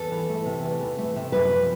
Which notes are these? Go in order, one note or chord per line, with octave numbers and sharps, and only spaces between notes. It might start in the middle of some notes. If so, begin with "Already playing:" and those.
Already playing: E2 A4
E3
A3
C3
E2
E3
A3
C3
F#2 B4
F3